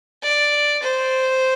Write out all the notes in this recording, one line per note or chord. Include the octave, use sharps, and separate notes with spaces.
D5
C5